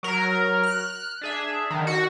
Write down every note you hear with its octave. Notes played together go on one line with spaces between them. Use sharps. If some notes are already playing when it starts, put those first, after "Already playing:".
F#3 A#4
F6 F#6
D4 G#4 E5
D3 D#3
F#4